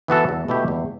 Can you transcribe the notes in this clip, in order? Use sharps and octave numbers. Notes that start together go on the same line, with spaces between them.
E3 B3 F#4 A4
E2
B2 A3 E4 G4
E2